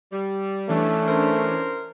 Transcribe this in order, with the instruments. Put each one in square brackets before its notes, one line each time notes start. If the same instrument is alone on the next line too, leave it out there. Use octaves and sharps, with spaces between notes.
[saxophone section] G3
[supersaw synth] E3 C#4 D4 [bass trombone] A3
[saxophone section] A#4 C5